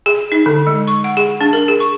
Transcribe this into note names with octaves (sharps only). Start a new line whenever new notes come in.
G#4
D#4
D3
G#3
C#6
F#5
G#4
D4
A#4
G#4
C#6